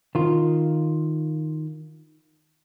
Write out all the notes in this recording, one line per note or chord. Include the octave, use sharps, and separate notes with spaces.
D#3 F4